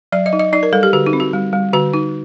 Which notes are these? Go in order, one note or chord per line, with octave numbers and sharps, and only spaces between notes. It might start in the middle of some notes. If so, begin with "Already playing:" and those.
F#3 D5
D#5
D#4
D#5
D#4 D5
A#4
G3 A4
G4
D3 F#4
D#4
C4
F#4
G3
G3
D3 F#4
D#4